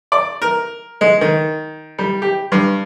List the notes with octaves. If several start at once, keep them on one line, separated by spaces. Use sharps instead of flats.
D5
A#4
G#3
D#3
G3
G4
G2